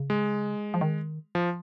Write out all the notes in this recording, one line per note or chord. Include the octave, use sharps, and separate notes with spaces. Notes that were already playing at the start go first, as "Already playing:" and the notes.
Already playing: C#3
G#3
F3
D#3
F3